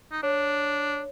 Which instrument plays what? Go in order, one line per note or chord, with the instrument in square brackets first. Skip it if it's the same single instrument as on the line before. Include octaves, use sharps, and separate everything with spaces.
[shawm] D#4
[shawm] D4 [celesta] C#5